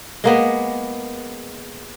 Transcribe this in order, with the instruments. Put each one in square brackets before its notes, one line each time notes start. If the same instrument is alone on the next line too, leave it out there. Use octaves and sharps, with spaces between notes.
[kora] G#3 A#3 B3